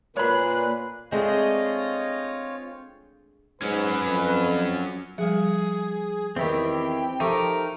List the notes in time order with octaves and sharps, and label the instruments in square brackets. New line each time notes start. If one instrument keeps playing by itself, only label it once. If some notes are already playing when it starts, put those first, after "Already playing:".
[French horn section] A#2 [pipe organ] A#3 B4 [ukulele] C#5 B5 [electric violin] F#6 C7
[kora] G#3 A3 D4 [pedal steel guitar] C4 G#4 [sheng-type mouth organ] F4 C#5 [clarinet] D#5
[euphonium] G#2 [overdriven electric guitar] F#3 C#4 [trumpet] B4
[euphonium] F2
[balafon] F3 G3 [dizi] G#4 [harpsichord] F#5
[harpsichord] E2 D#3 [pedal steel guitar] C4 E4 G4 [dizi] G5
[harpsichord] F3 A3 G4 [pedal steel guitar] D#4 A#4